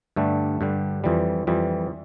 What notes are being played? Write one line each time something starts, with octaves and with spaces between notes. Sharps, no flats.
G2 D3 G3 A3
G2 D3 G3
F2 E3 G3
F2 E3 G3